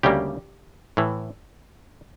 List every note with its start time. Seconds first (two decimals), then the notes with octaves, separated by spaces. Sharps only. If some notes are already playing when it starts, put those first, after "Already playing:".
0.03 D2 C#3 G3 A#3 G4
0.97 A2 E3